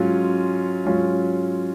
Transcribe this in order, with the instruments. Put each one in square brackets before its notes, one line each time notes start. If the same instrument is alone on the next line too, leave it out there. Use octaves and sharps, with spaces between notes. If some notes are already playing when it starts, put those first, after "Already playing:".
Already playing: [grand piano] G#2 F#3 C#4 F4
G#2 F#3 C#4 F4